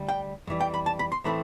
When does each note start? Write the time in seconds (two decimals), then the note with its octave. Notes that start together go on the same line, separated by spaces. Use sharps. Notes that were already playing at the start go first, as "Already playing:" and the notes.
Already playing: D2 G3
0.09 G5
0.47 F2 E3 G3
0.60 G5
0.74 B5
0.86 A5
0.99 B5
1.12 C6
1.24 A2 E3 A3 C4 B5